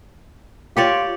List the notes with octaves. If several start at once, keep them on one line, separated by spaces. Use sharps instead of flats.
F4 G4 C#5 D5